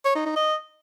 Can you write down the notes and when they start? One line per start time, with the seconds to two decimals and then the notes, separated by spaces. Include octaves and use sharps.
0.05 C#5
0.15 D#4
0.26 D#4
0.36 D#5